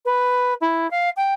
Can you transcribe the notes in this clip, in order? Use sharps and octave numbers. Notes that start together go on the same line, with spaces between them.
B4
E4
F5
G5